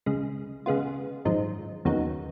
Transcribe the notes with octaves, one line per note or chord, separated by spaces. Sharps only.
C#2 C#3 G#3
C#3 G#3 B3 F4
G#1 F#2 F3 G#3 D#4
D#2 C#3 F#3 B3 D#4